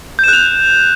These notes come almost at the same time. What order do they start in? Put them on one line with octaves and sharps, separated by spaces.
G6 E7 F#6 F7